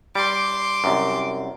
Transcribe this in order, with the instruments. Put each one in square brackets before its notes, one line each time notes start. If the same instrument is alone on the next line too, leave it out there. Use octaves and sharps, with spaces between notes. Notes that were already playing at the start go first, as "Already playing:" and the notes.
[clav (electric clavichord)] G3 [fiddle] C6 D6
[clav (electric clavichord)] C2 F#2